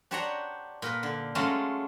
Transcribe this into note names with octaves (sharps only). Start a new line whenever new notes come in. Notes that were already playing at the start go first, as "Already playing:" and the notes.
D4 G4 C5 C#5 F#5 A#5
A#2 A#4 B4
D3
F#3 G#3 A3 C#4 F4 A#5